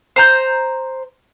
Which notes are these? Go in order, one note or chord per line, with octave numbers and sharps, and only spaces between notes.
C5 A#5 G6